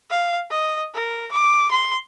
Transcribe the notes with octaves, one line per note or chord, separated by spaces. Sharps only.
F5
D#5
A#4
D6
C6